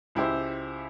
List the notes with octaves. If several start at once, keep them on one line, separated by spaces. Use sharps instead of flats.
C#2 E4 G4 C5